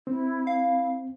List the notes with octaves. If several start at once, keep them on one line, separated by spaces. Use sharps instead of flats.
C4 E4
E4 F5